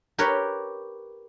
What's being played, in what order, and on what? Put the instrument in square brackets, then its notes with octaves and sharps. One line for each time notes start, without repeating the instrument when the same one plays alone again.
[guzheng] G4 A#4 B4 C#5